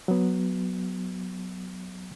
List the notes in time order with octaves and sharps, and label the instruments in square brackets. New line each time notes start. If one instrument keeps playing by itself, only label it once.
[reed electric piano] F#3 B3